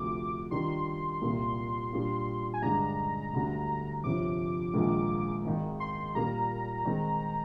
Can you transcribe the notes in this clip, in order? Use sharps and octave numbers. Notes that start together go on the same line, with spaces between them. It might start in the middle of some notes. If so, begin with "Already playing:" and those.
Already playing: D2 C3 F3 D6
D#3 G3 D4 F4 C6
C2 A#2 G3 A#3
A#2 G3 D4
G#5
G2 D3 G#3 D4 A#5
D2 D3 G3
G1 F2 C3 F3 D6
A#1 G#2 D#3 A#3 F4
G#1 G#2 D#3
C6
A#2 G3 A#3 A#5
D#3 G#3 C4